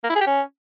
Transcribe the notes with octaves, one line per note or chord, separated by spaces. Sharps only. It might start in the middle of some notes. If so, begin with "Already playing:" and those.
A#3
E4
G#4
G4
C#4